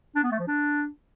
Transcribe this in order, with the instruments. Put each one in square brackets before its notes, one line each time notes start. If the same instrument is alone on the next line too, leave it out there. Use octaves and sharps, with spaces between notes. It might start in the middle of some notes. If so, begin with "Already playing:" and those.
[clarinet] D4
B3
A3
F3
D4